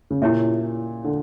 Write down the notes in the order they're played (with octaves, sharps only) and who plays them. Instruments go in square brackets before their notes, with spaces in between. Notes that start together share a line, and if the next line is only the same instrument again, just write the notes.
[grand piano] C#3
[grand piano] A#2 [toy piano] E4 G4 C#5 E5
[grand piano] D3